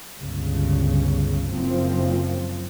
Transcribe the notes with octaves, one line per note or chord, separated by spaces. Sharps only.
G1 C#2 G2 C#3
F#1 F#2 F3 C4